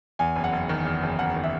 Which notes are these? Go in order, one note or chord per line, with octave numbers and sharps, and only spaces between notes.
E2 G#5
F#1
F#5
F#1
D#3
E2
F#1
F#1 F#5
D#3
E5